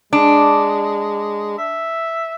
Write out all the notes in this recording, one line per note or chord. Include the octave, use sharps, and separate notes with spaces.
G#3 D4
E5